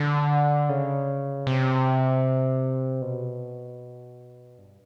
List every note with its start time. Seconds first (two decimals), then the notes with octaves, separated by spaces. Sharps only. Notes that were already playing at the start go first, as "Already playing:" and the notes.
Already playing: D3
0.69 C#3
1.47 C3
3.02 B2
4.58 G2